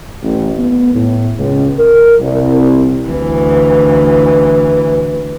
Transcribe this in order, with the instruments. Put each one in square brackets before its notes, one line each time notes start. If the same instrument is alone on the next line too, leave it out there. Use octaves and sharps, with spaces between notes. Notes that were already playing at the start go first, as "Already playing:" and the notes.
[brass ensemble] A1
B3
A2
C#2
A#4
C2
[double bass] D2 E3